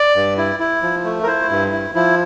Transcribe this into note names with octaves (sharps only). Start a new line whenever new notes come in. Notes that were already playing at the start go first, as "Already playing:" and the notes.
Already playing: D5
G2
E4
E4
F3
A3
A#4
E4 C5
G2
E4
F3 E4